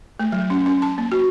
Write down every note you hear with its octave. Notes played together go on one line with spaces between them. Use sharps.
A3
F#3
C#4
C#4
A5
A#3
F#4